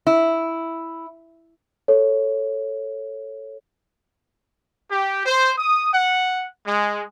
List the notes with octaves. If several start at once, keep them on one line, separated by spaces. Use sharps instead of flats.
E4
A4 C#5
G4
C5
D#6
F#5
G#3